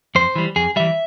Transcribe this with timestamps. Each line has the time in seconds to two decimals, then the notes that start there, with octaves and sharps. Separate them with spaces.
0.15 F2 C5
0.36 E3 G3
0.56 F2 G#4
0.76 E3 G3 E5